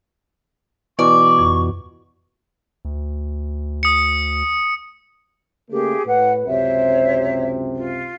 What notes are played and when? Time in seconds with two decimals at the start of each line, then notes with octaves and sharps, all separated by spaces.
0.99 B2 E3 D5 C#6
1.38 F2
2.85 D2
3.83 D#6 C#7
5.71 C#3 A3 A#3 G4 G#4
6.07 A2 B4 F#5
6.46 C#2 F#2 C3 C5 C#5 E5
7.73 F4